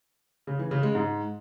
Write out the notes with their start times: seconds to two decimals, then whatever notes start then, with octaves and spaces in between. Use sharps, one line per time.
0.47 C#3
0.59 E3
0.71 C#3
0.83 G#3
0.95 G#2